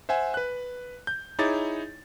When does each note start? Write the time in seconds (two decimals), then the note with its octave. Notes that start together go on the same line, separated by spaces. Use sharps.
0.09 C5 E5 F#5 G#5
0.34 B4 F#6
1.07 G6
1.39 D#4 E4 G#4 C#5 D6 A6